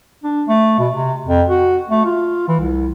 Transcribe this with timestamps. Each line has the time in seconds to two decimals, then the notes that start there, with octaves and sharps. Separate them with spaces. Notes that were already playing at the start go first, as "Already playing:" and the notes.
0.24 D4
0.48 A3
0.79 B2
0.93 C3
1.27 F2
1.48 F#4
1.90 A3
2.05 F4
2.48 E3
2.59 C2